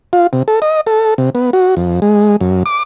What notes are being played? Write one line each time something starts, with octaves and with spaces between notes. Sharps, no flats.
F4
C3
A4
D#5
A4
C3
B3
F#4
F2
G#3
F#2
D6